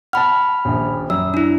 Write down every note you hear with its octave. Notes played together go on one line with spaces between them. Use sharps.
F#5 A5 B5 F6
D#1 A#1
F#2 E6
D4 E4